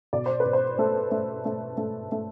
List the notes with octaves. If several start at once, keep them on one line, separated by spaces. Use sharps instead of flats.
B2 D5
C5
B4
B2
C5
A3 A4
A3
A3
A3
A3